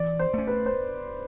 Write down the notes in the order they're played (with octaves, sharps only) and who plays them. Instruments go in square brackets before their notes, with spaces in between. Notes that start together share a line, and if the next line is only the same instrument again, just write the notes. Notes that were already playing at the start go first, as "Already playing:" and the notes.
Already playing: [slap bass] E3 [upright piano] D5
[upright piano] C5
[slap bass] A3 C#4
[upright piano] B4
C5